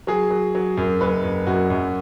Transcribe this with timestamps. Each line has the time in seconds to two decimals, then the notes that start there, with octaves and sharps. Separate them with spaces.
0.07 F#3 G#4
0.30 F#3
0.55 F#3
0.77 F#2
1.01 F#1 B4
1.24 F#1
1.47 F#2 F#4
1.70 F#2